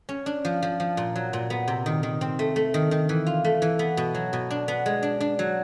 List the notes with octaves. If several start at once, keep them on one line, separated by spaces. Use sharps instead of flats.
C#4
D4
F3
F3
F3
A#2
F#3
A#2
B3
C3
D#3
D#3
C4
A3
A3
D#3
D#3
E3
F4
A3
E3
B3
B2
F#3
B2
D4
B3
G#3
D4
D4
F#3